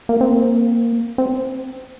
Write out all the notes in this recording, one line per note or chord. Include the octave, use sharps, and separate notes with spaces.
A#3
C4
A#3
C4